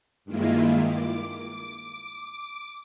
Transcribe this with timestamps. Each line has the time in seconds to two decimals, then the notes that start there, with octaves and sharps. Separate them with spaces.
0.25 G2 D#3 G#3 A#3 E4 F4
0.85 D6